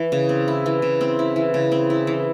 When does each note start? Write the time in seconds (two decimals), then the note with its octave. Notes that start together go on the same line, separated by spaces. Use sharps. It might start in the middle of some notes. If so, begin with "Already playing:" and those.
Already playing: E3
0.12 C#3
0.29 C4
0.48 E4
0.66 E3
0.82 C#3
1.01 C4
1.19 E4
1.36 E3
1.54 C#3
1.72 C4
1.90 E4
2.07 E3